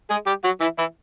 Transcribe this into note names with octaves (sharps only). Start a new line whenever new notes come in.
G#3 G#4
G3 G4
F#3 F#4
E3 E4
E3 E4